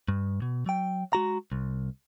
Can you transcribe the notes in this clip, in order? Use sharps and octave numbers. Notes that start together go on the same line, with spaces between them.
G2
B2
F#3 G5
G#3 F#4 A#5
C2